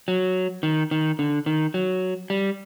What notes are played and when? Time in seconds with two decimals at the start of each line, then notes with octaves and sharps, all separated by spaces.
0.08 F#3
0.63 D#3
0.91 D#3
1.19 D3
1.46 D#3
1.74 F#3
2.30 G3